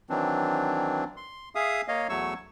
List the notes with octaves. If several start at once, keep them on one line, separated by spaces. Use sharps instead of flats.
D#3 E3 F#3 C4 D4
C6
G#4 E5 F5 D#6
A#3 C#5 D#5 F5
E2 F#3 A3 C#5 C#6 E6